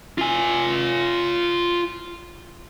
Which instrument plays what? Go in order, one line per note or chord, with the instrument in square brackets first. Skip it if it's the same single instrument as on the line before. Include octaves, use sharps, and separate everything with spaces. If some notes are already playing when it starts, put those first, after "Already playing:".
[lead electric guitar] F4 G#5